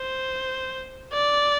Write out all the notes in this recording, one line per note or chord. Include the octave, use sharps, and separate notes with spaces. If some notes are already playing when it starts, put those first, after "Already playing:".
Already playing: C5
D5